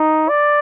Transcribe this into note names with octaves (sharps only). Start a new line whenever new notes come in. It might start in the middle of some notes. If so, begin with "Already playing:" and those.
Already playing: D#4
D5